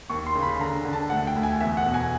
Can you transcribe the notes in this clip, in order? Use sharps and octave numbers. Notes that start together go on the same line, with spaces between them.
D#2 C#6
C6
C#3
B5
D3 A#5
D3
A5
D2 F#5
G5
D2
G#5
E2 E5
F#5
B2
G#5